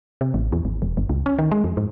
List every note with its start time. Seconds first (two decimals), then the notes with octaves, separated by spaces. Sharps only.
0.21 C3
0.34 A1
0.52 E2
0.65 G#1
0.82 E1
0.97 G1
1.09 C#2
1.26 C#4
1.39 D#3
1.51 G#3
1.64 F2
1.77 G#2